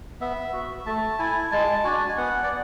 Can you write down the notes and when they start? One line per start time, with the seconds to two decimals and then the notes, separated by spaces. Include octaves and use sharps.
0.21 B3 E5
0.53 F#4
0.86 A3 A5
1.19 E4 G#5
1.52 G#3 A5
1.84 D4 F#4 G#5
2.08 G#5
2.17 B3 F#5
2.43 D5